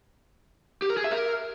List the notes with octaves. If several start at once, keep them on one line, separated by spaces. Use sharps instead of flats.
G4
A#4
G#4
E5
A#4